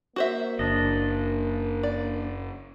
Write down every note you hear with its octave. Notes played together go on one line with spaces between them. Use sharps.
A#3 F#4 C5 E5
F#1 D4 D#5
D5